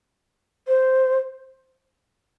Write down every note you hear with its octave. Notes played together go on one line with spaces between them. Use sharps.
C5